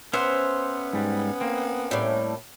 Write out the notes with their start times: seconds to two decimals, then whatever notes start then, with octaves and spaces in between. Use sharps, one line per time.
0.13 B3 C#4 C5 E5 F#5
0.93 G#2 G3
1.41 A#3 C4
1.91 A2 G3